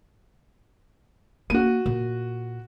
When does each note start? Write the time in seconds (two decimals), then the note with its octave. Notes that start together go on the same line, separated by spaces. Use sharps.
1.50 A#3 F#4 D#7
1.86 A#2